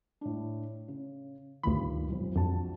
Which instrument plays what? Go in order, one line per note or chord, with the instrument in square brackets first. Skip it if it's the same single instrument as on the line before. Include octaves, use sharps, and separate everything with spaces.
[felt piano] A2 D4
C#3
[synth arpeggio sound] D2 B5 [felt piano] G2 A#2 D#3
[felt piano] B1 F2
[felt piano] A#1 F#4 A5 [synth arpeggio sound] F2